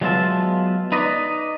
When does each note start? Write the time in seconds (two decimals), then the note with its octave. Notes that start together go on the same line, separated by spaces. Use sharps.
0.01 F#3 G#3 B3 F4 E5 A5
0.92 D#4 B4 D5 D#5